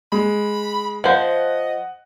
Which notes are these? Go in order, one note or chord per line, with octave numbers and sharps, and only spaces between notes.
G#3 B5
F3 C5 D#5 F#5